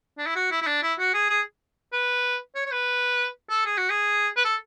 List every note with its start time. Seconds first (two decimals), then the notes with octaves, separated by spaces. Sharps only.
0.18 D4
0.26 E4
0.36 F#4
0.51 E4
0.62 E4
0.67 D4
0.83 E4
0.99 F#4
1.14 G#4
1.30 G#4
1.93 B4
2.55 C#5
2.66 C#5
2.71 B4
3.50 A4
3.65 G#4
3.77 F#4
3.90 G#4
4.37 B4
4.44 A4